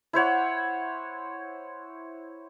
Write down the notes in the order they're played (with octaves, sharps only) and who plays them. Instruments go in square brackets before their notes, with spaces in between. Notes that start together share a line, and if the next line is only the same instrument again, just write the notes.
[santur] E4 C5 C#5 F#5